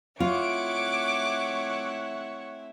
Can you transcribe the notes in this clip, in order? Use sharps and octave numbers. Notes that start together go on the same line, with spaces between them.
A3 C4 E4 F4 C#5 F#5 D6